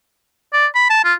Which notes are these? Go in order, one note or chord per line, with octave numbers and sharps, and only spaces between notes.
D5
B5
A5
F4